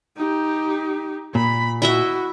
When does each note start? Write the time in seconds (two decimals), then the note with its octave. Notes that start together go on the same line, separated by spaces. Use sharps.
0.17 D#4 G4
1.35 A#2 B5
1.82 E4 F#4 D#5 E5